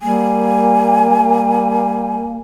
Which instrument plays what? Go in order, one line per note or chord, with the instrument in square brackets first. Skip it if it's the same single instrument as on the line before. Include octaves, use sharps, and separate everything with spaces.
[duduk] G3 [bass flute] A#3 [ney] G#5
[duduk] G3